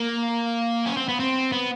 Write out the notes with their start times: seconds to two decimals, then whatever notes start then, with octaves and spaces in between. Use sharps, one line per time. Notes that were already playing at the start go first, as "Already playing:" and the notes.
Already playing: A#3
0.86 C#4
0.97 C4
1.08 B3
1.20 C4
1.52 B3